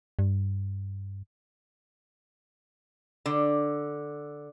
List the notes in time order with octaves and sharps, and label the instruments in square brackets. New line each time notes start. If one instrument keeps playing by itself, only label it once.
[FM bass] G2
[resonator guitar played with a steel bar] D3